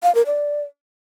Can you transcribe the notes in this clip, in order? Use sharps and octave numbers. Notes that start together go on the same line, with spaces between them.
F5
A#4
D5